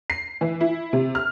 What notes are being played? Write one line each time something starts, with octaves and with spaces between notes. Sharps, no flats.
C7
E3
E4
C3
F6